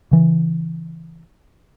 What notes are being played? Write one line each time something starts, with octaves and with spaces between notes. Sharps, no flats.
C#3 E3